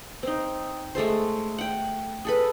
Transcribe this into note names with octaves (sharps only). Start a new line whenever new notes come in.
C4 D#4
G#3 A3 A4 C5
F#5 G5
G#4 A4 B4